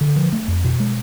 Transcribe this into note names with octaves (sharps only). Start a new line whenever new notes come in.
D3
F3
A3
F2
B2
G#3